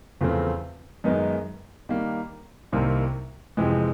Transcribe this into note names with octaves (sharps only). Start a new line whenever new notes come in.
E2 C#3 F3 A3 C4
F#2 D#3 G#3 B3 D#4
D#3 G3 A#3
C2 C3 D#3 G3 A#3
F2 C3 E3 G#3